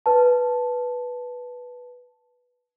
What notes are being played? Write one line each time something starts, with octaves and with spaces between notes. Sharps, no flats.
B4 A5